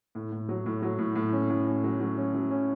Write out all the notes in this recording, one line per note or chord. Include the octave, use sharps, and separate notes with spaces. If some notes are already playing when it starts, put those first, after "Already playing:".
A2
A2
F#3
A2
F#3
A2
A2
C#4
A2
C#4
F#3
F#3
C#4
F#3
C#4